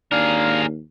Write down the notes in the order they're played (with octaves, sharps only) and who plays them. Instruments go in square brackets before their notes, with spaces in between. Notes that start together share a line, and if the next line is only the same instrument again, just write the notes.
[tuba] D#2 [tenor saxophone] D4 [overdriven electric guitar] G#4 A#4 [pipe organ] F5